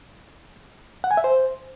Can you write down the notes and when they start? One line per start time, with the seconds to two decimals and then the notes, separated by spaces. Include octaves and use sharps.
1.04 F#5
1.11 G#5
1.17 E5
1.24 C5